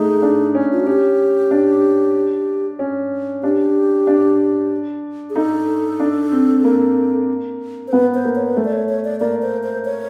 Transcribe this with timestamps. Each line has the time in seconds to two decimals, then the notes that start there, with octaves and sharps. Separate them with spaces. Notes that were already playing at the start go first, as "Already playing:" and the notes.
Already playing: A3 D#4 G#4
0.22 D4
0.55 C#4
0.72 F4
0.80 F#4
0.87 C#4 G4
1.51 D4
2.79 C#4
3.43 D4 G4
4.07 D4
5.30 G#4
5.35 D#4 A4
6.00 D4
6.32 C4
6.64 A#3
7.88 C5
7.92 B3 B4
8.14 C5
8.25 A#3
8.35 C#5
8.47 B4
8.56 A3 C5
8.65 D5
8.73 C#5
8.89 C#5
9.04 D5
9.20 A#3 D5
9.42 C5
9.63 C5
9.85 C#5